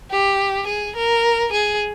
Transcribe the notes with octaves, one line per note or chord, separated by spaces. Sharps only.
G4
G#4
A#4
G#4